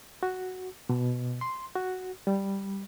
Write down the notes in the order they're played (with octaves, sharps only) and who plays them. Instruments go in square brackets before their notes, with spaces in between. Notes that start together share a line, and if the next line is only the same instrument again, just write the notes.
[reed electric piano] F#4
B2
C6
F#4
G3